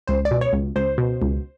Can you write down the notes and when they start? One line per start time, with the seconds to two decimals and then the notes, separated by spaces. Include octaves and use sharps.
0.08 C#2 C5
0.25 D5
0.31 B2
0.41 C#5
0.53 C#2
0.76 C#2 C5
0.98 B2
1.22 C#2